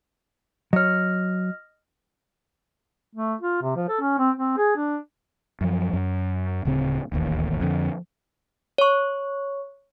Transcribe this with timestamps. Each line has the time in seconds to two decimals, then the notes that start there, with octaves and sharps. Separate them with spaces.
0.73 F#3 C#5 D#5 F6
3.15 A3
3.41 F4
3.61 C3
3.76 F3
3.89 A4
4.01 C#4
4.19 C4
4.37 C4
4.57 G#4
4.76 D4
5.61 F#2 F3
5.93 F#2
6.65 D1 C#3 C4
7.12 D1 A1 D#2
7.61 F2 D3
8.78 C#5 C#6